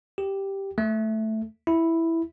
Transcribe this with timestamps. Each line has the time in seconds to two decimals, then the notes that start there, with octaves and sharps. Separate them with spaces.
0.18 G4
0.78 A3
1.67 E4